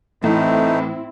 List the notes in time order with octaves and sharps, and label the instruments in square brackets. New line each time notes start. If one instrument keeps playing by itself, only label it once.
[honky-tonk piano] A2 [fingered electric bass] E3 [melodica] A3 D#4 [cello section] C4 E4